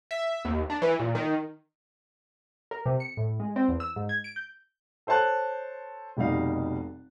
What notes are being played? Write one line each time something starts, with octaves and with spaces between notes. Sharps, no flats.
E5
D#2
D4
E3
A#2
D#3
A#4
C3
C#7
A2
G#3
C4
E2
E6
G#2
G#6
D7
G6
A4 C5 C#5 A5 F#6
F1 B2 G3 D#4 F5